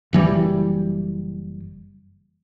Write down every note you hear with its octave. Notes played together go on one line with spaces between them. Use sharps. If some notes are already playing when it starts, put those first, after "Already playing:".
F#1 E3 G3